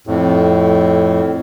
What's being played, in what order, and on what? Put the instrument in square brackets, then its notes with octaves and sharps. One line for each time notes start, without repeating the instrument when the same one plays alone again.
[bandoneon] F2 A2